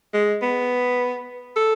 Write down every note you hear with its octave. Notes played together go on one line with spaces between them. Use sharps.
G#3
B3
A4